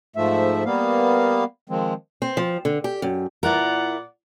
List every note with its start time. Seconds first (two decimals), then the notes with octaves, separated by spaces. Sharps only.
0.16 G#2 F3 A3 E5
0.66 G3 A#3 B3 F5
1.70 D#3 F3 G#3 C4
2.22 C4
2.37 F3
2.65 D3
2.84 G4
3.02 F#2
3.43 A#2 E4 A#4 D5 F#5